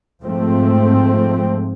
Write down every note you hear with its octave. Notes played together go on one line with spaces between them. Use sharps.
G#2 F3 A3 C4